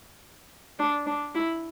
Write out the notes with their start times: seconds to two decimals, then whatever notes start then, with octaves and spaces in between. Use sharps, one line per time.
0.79 D4
1.06 D4
1.35 E4